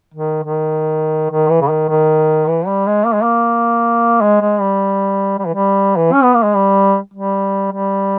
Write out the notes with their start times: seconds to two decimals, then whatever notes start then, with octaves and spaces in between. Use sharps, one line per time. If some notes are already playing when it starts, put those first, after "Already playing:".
0.14 D#3
0.44 D#3
1.31 D#3
1.50 E3
1.61 C#3
1.70 D#3
1.89 D#3
2.48 E3
2.67 G3
2.86 G#3
3.06 A#3
3.14 G#3
3.23 A#3
4.22 G#3
4.41 G#3
4.60 G3
5.39 G3
5.46 E3
5.54 G3
5.96 E3
6.13 C#4
6.23 B3
6.34 A#3
6.44 G#3
6.55 G3
7.14 G3
7.72 G3